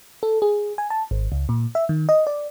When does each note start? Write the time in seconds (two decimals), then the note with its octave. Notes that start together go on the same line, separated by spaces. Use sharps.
0.23 A4
0.42 G#4
0.78 G#5
0.90 A5
1.11 G#1
1.32 C#2
1.49 A#2
1.75 E5
1.89 D#3
2.09 D#5
2.27 D5